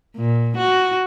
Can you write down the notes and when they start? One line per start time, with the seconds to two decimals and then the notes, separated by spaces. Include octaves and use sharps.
0.16 A#2
0.57 F#4